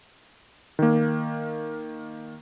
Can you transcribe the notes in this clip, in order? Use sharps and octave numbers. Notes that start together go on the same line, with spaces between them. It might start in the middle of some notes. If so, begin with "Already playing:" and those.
D#3 A#3